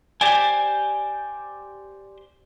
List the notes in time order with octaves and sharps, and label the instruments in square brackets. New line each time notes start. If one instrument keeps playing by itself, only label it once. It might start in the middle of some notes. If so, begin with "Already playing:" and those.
[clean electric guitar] G4 C5 D5 G5 G#5